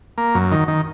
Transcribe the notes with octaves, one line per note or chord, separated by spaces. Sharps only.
A#3
F#2
D#3
D#3